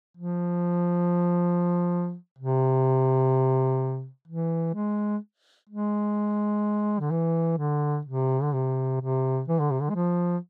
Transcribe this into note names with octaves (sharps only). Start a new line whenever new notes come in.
F3
C3
E3
G#3
G#3
D3
E3
D3
C3
D3
C3
C3
E3
D3
C3
D3
G#3
F3